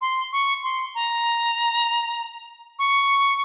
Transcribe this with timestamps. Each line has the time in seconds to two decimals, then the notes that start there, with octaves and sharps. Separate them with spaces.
0.01 C6
0.32 C#6
0.63 C6
0.95 A#5
2.79 C#6